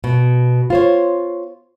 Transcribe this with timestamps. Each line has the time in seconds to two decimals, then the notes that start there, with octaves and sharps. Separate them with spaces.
0.04 B2
0.70 F4 C5 C#5